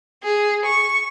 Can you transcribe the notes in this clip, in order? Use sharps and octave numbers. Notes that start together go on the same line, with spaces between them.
G#4
C#6